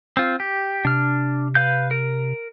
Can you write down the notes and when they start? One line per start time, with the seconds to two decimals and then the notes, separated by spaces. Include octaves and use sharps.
0.17 C4 F4
0.40 G4
0.85 C3 D4 F6
1.55 B4 F5 G6
1.91 A#4